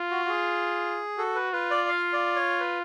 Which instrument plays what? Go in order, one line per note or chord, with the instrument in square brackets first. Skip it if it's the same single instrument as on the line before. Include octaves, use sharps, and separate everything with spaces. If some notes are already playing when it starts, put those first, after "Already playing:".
Already playing: [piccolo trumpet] F4
[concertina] F#4
F#4
G#4
[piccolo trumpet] F#4 [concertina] A4
[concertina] B4
[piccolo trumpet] F4 [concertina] B4
[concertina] D5
F5
D5
C#5
B4